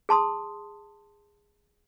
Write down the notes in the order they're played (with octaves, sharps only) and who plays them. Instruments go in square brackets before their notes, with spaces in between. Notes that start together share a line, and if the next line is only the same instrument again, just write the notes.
[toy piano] G#4 A5 C6 D#6